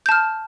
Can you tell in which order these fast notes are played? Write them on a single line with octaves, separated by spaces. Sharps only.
G6 A5 F6